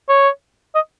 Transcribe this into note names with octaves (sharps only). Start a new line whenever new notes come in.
C#5
D#5